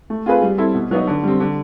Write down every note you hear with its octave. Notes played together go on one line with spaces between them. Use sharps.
A3
C4 F4 G#4 B4
G3
C4 E4 A4
B2
F#3 B3 D#4
D3
G3 C4
D3